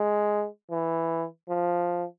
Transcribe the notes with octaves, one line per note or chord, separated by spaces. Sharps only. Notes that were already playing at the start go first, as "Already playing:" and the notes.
Already playing: G#3
E3
F3